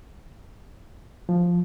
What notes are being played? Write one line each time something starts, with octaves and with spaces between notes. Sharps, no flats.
F3